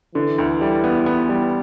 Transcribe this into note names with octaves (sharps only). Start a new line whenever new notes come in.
D3 E3
D2
G3
B3
B3
G3